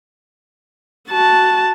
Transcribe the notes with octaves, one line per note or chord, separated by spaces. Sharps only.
F#4 A5